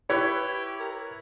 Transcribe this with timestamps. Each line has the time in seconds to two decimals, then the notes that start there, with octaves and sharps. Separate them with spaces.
0.10 E4 G4 B4 C#5
0.80 A#4